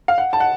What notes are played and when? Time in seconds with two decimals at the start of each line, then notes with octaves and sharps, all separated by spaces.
0.08 F5
0.18 F#5
0.33 A5
0.40 F#5